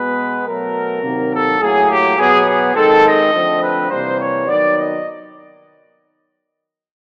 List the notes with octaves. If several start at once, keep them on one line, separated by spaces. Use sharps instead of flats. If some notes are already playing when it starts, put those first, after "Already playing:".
Already playing: B2 G#3 B3 B4
B2 F#3 A3 A#4
C3 D#3 F#3 A#3
A4
A2 F#3 A#3 G#4
G4
B2 F#3 B3 G#4
G#4
D#3 G#3 C4 A4
D#5
D3 F3 A3 C4
B4
C3 E3 G3 A#3 C5
C#5
D#3 F#3 B3 D5
D#5